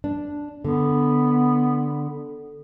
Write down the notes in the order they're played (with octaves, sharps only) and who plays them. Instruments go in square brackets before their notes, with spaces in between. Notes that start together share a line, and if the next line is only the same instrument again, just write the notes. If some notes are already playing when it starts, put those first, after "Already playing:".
[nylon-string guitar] D4
[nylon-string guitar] D3 [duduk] B3